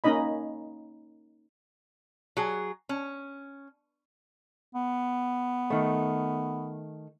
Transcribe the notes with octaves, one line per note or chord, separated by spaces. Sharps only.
A#3 C#4 D#4 D#5 B5
F#3 G#4
C#4
B3
D#3 A3